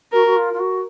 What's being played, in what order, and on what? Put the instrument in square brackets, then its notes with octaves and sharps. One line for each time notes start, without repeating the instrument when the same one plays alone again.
[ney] F#4 [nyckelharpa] A#4
[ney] F#4
F4
F4
F#4